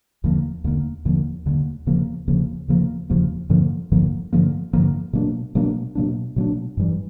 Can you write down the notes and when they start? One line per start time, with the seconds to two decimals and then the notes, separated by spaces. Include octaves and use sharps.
0.24 D#2 D3 F3 A#3
0.64 D#2 D3 F3 A#3
1.05 D#2 D3 F3 A#3
1.46 D#2 D3 F3 A#3
1.86 D#2 C#3 F3 A#3
2.28 D#2 C#3 F3 A#3
2.68 D#2 C#3 F3 A#3
3.10 D#2 C#3 F3 A#3
3.50 G2 D3 F3 A#3
3.92 G2 D3 F3 A#3
4.33 G2 D3 F3 A#3
4.73 G2 D3 F3 A#3
5.13 B2 F#3 A#3 D4
5.55 B2 F#3 A#3 D4
5.95 B2 F#3 A#3 D4
6.36 B2 F#3 A#3 D4
6.77 G2 E3 G3